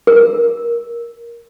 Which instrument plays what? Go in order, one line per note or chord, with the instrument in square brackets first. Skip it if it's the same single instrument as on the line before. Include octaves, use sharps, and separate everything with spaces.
[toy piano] A#4